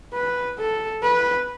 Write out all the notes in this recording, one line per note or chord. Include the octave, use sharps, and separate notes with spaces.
B4
A4
B4